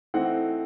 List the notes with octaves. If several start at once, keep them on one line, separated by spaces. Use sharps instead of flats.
E3 A3 C4 D#4 F#5